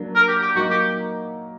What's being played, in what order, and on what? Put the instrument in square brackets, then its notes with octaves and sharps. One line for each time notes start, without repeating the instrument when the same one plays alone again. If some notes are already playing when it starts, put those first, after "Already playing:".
Already playing: [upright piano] F#3 A#3 D4
[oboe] A#4
G4
G4
[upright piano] F#3 A#3 D#4 [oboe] F#4
[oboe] G4